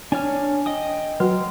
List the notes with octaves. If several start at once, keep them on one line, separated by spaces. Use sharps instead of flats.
D4 C#5 G#5 F6
D#5 G5 D#6
F#3 F#4 B4 F#5